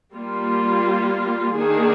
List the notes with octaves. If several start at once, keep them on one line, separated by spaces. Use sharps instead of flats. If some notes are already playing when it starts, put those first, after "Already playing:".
G3 A#3 F4
D#3 A#3 D4 G#4